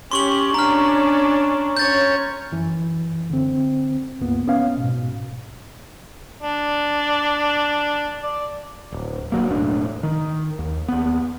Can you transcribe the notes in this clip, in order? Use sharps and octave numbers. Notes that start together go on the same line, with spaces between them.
C#4 G4 C6 C#6 F#7
C#4 D4 A#5 F6
C#4 C#5 G6 A6
F#2 E3
D3 C4
C#2 G2 A#3 B3
B3 C#4 F5
G#2 B2
D4
D5
D1
D1 C2 F#3 A#3
E1 A2 D4
D#3
D#2
D#2 B3